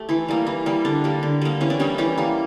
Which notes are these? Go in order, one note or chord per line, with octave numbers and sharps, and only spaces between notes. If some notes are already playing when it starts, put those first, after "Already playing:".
Already playing: A3 G4
E3 E4
G3 A#3
E3
G3 A#3
D3 D4
G3 A#3
D3
G3 A#3
E3 C#4
D4
G3 A#3 C#4
E3 G4
G3 A#3